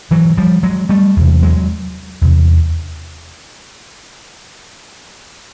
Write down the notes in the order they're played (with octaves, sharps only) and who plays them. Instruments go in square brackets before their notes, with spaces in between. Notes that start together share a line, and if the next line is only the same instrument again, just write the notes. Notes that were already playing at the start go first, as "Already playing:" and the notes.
[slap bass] G#2 E3 F#3
F3 G3
F#3 G#3
G3 A3
E2 C3
F#3 G#3
E2 C3